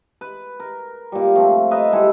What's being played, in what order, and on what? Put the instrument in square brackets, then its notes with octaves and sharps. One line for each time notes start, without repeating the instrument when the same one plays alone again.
[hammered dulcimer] B4
A#4
A#2 G3
F3 A3 C4
B4 D#5 E5 A#5
G3 G#3 E4 A4